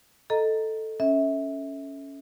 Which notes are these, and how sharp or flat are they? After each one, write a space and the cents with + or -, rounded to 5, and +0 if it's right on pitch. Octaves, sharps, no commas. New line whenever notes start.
A4 +0 D#5 +0 A#5 +0
C#4 +0 E5 -25